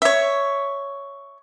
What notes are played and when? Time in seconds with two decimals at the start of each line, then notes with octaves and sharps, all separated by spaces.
0.02 C#5 E5